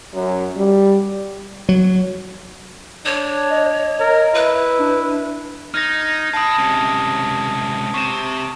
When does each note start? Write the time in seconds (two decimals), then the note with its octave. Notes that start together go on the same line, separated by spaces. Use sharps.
0.13 F#2
0.56 G3
1.69 F#3
3.05 D4 C#5
3.50 D#5
4.00 A#4
4.34 E4 B4
4.79 D4
5.74 D#4 F6 G#6 A#6
6.33 F5 A5 B5 D#6
6.58 C#2 C3
7.94 C3 C#6 E7